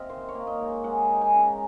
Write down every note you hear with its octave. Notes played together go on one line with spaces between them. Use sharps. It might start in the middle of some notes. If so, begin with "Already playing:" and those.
Already playing: C3 C4 D#5 F5
D#3 C5
C#5
A#3
D#5
G#2
G#3 F#5
D#4
G#5
C#3
A#5